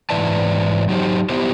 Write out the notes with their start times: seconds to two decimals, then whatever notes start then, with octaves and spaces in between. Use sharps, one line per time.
0.10 G#2 E3 E4 B4 D5 A5
0.89 F#3 D#4 G4 C5
1.29 B3 E4 G4 C5